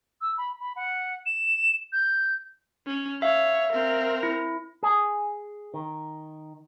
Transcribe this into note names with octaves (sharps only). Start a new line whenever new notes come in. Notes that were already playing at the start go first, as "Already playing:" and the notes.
E6
B5
B5
F#5
E7
G6
C#4
C#5 E5 F5
C4 A#4
E4
G#4
D#3